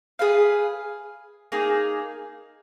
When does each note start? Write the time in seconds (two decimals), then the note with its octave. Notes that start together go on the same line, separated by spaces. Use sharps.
0.19 G#4 B4 F5
1.52 A#3 D#4 G#4